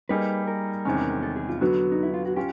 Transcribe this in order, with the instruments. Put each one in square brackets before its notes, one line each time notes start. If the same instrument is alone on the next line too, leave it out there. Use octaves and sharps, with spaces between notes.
[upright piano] G3 A#3 D#4 G#4 [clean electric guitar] B4
[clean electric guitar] A#4
[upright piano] E2 C3 D#3 G#3 C#4
[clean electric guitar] A4
G#4
F4
[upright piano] D3 F#3 B3 [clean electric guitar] F#4
[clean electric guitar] D#4
E4
F4
F#4
[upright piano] C#4 F4 [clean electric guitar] G4